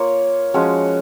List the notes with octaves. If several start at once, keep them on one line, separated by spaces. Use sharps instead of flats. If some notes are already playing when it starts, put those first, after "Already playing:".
Already playing: A#3 F4 A#4 C#5
F3 G#3 C#4 F#4